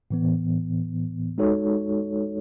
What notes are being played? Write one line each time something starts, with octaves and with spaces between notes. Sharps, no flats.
A2 E3 B3
G#3 D#4 F#4 A4 C#5